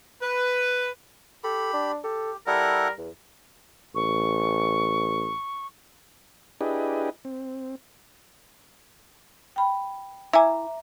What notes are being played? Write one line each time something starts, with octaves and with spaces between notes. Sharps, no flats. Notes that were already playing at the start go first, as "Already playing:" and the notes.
B4
G4 A4 B5
D4
G4 A4
G3 E4 A4 A#4 F#5
E2
A1 C#6
D4 E4 G4 G#4 B4 D#5
C4
G5 B5
E4 E5 G#5 A#5 D6